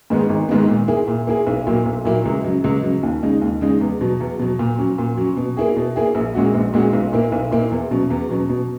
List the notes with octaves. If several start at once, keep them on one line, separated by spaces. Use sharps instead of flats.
G#2 D#3 G#3 B3
G#1
G#2 D#3 G#3 B3
A#2
A#3 E4 G#4
A#2
A#3 E4 G#4
B1
A#2 F#3 A#3 E4
B1
A#2 F#3 A#3 E4
C#2
C#3 F#3
C#2
C#3 F#3
D#2
C#3 G#3 D#4
D#2
C#3 G#3 D#4
E2
B2 F#3
E2
B2 F#3
A#2
F#3 C#4
A#2
F#3 C#4
B2
A#3 E4 G#4
B2
A#3 E4 G#4
A#1
A#2 G#3 C#4 F#4
A#1
A#2 G#3 C#4 F#4
B1
A#2 A#3 E4
B1
A#2 A#3 E4
E2
B2 F#3 C#4
E2
B2 F#3 C#4
B2